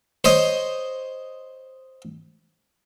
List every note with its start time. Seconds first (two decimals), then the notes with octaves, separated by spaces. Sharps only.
0.24 C5 C#5 D#5